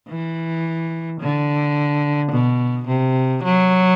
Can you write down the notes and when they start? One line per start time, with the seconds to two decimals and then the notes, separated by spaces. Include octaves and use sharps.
0.09 E3
1.21 D3
2.32 B2
2.88 C3
3.44 F#3